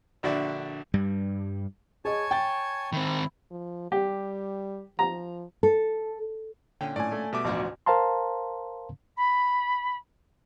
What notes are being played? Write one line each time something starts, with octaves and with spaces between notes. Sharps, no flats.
A#1 D3 F#4 D5 E5
G2 G3
G#4 C#5 D#5 G#5 A5
G5 A6
D#3 C4 E4
F3
G3 G4
F3 A#5
A4
A#2 D3 C#4 G5
A2 D5 G#5
A3
B2 G3 E5 D6
A1 D2 A2 F3 F#4
A#4 C5 F5 A5 A#5 C6
B5